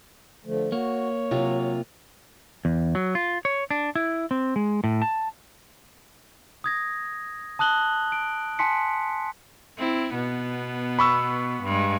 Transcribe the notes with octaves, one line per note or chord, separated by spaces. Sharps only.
D3 F3 A3
A#3 F#4 C#5
C3 F#3 F4
E2
F#3
F4
C#5
D4
E4
C4
G#3
A2
A5
D#6 G#6 A#6
A5 D#6 F#6 F#7 G7
D7
G#5 A5 C6 B6 C#7
C4 E4
B2 B3
B5 C#6 E6
G2 G#3